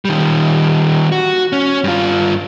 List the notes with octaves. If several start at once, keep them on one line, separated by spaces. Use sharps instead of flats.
D#3 G3
F#4
C#4
G2 F4